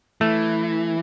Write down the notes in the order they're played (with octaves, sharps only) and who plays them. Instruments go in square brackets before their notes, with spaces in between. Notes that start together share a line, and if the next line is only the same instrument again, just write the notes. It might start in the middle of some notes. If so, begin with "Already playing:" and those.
[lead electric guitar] E3 [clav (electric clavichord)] A3